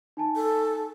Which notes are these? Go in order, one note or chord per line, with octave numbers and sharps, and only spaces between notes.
D#4 G#5 A5
A4